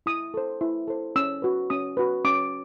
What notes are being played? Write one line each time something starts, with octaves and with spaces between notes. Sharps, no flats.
E4 D#6
A4 C5
E4
A4 C5
C#4 E6
F#4 B4
C#4 D#6
F#4 B4
C#4 D6